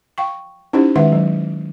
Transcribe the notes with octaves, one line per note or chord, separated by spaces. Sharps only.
F5 G5 C#6
C#4 D#4 E4 G4 C5
D#3 G#3 B4 E5 F#5
F#3